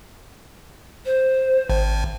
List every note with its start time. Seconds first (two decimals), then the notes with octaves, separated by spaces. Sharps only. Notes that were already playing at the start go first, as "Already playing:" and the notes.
1.06 C5
1.70 G#1